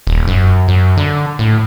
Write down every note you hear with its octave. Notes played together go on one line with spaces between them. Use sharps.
D#1
F#2
F#2
D3
A2